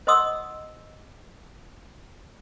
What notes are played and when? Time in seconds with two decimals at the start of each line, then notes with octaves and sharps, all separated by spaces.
0.07 C5 D#5 F#5 C6 D#6 E6